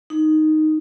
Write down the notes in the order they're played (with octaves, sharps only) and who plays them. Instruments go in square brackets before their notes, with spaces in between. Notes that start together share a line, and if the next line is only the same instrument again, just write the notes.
[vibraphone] D#4